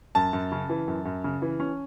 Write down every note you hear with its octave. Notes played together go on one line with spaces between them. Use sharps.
F#2 A5
F#2
C#3
E3
F#2
F#2
C#3
E3
C#4